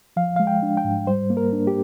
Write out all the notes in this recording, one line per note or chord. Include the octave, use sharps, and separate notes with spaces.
F3 F5
G#3 F5
G5
D4
G5
G#2
G3 C5
A#3
A#4
D4
G4